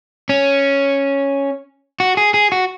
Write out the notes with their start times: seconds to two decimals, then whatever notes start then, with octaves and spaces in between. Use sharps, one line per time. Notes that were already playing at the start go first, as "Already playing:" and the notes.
0.29 C#4
2.00 F#4
2.17 G#4
2.34 G#4
2.52 F#4